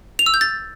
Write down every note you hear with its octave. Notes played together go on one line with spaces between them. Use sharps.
F7
E6
G6
A6